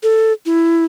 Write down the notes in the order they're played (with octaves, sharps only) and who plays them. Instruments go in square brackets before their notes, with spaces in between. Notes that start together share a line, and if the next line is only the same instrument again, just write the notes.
[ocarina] A4
E4